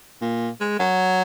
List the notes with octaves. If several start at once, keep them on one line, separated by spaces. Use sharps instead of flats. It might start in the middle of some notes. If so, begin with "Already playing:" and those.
A#2
G#3
F#3